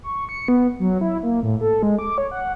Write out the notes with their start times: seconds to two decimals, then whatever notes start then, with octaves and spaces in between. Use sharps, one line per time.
0.03 C#6
0.29 C#7
0.48 B3
0.79 F#3
1.01 E4
1.23 A#3
1.43 A2
1.61 A4
1.83 G#3
1.99 D6
2.18 C#5
2.31 F#5